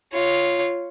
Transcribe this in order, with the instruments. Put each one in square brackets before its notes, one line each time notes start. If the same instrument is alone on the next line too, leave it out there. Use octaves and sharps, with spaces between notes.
[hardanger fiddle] F4 C#5